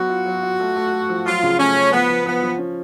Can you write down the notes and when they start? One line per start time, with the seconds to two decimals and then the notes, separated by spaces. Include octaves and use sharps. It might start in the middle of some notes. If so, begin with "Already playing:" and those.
Already playing: F#3 B3 F#4
0.09 F4
0.26 F#3
0.43 F4
0.59 A3
0.76 A3
0.92 A3
1.09 F3
1.26 F#3 F4
1.43 C#3
1.59 A3 C#4
1.76 A3
1.92 F3 B3
2.09 F3
2.26 F3 B3
2.42 F3
2.59 C#4